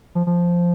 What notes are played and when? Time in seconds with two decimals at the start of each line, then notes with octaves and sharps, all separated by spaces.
0.15 F3
0.27 F3